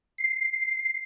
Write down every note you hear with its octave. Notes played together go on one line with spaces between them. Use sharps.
C7